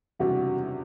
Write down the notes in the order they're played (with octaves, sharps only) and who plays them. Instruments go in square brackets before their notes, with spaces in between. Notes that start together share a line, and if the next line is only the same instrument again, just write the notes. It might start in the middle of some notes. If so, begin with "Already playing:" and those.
[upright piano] F#1 E2 C3 G3 D4 [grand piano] F#4